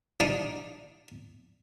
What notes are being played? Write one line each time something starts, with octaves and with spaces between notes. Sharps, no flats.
D4 D#4